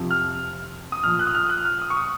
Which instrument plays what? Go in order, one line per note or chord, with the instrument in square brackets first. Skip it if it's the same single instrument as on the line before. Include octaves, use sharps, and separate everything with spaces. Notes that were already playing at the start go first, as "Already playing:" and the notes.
Already playing: [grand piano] F2 C3 F3
F6
D#6
A#2 F3 F6
F#6
D#6
F6
F#6
F6
D#6
C#6
D#6